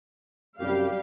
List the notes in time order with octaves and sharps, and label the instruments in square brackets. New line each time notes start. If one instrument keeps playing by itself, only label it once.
[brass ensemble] C2 F#2 [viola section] G3 G4 F5